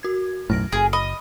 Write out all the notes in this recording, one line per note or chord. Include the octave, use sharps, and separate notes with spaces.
F#4 G#6
B1 F#2 A2 F6 A#6 D7
F#1 G#4
D#5 B5